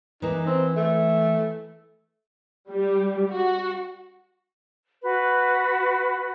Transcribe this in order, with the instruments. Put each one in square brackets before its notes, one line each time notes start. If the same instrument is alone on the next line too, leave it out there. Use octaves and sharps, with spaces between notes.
[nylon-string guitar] E3 A#3 [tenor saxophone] D#4
[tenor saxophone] C4
A3
[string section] G3
F#4
[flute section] F#4 B4